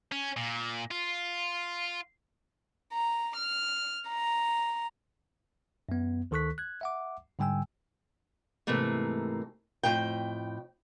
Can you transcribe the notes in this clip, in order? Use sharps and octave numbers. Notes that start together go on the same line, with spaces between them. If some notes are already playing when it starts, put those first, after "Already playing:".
C#4
A#2
F4
A#5
F6
A#5
F#2 B3
D2 D#3 A4 C#6 F#6 B6
F#6 G#6
E5 F#5 D6
G#2 D3 G3 G5 G#5 E6
G#2 C3 E3 A3 A#3
F2 A2 G5